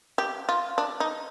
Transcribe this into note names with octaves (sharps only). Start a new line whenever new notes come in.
G4
F4
D4
D#4